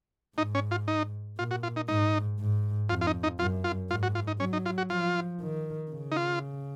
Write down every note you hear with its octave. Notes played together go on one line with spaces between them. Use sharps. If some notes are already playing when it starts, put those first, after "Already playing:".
G#2 D#4
C#4
F4
D#4
A#2 F4
F#4
F4
D#4
G#2 D#4
G#2
F2 F4
F4
D#4
D#4
F#2 F4
F4
G#2 F4
F#4
F4
D#4
F#3 C#4
D#4
F4
F#4
F3 F4
D#3
C#3
D#4
F4